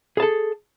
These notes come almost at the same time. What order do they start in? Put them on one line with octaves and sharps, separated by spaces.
G#4 A5 A4